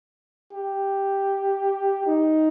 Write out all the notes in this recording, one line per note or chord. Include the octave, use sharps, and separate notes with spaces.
G4
D#4